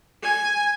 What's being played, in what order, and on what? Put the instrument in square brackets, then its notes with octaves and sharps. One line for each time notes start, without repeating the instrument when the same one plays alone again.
[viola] G#5